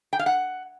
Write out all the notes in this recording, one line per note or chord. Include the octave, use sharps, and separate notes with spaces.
G5
F5
F#5